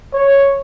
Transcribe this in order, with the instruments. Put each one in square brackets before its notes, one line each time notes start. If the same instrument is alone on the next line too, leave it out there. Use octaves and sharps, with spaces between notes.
[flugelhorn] C#5